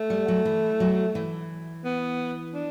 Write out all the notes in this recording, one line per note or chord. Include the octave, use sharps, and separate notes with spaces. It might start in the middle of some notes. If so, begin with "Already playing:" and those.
Already playing: A3
G3
F#3
E3
F#3
E3
B3
D4